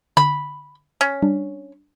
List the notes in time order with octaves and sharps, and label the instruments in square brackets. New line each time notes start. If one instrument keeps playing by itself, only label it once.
[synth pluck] D3 [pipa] B5
[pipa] C#4
[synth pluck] G3 D4